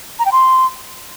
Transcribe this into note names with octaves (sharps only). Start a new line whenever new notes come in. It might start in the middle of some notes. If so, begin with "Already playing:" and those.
A#5
G5
C6